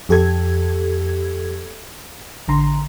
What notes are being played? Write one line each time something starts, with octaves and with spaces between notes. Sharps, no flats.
F2 G4 A4 G#6
A1 D3 A#5 C6